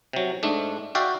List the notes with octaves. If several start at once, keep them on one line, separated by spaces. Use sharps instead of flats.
C3 F#3
G#2 A3 D4
F#4 D5 E5 F5 G5